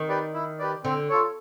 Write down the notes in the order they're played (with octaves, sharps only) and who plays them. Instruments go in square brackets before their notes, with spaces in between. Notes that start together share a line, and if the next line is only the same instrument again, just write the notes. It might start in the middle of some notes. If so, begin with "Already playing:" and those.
Already playing: [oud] D#3
[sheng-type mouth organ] G4 B4 D5
E4
G4 B4 D5
[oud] D3 [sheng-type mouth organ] C4
[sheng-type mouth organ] F4 A4 C#5